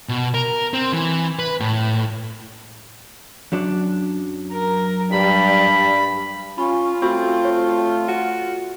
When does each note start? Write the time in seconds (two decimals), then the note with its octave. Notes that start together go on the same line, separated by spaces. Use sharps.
0.09 B2
0.34 A#4
0.73 C4
0.93 E3
1.39 B4
1.60 A2
3.52 F#2 F#3 D4
4.52 A#4
5.12 G2 G3 B5
6.58 C#4 F4 B5
7.02 A3 C4 F#4 B5 C#6
7.45 C#5
8.08 F#4